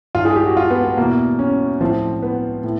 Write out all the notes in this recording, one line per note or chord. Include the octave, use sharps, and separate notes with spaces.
G2 E3 F4
G#4
G4
F#4
F4
B3
B3
E2 B2 A#3
C#4
A2 F3 C4
B3
A2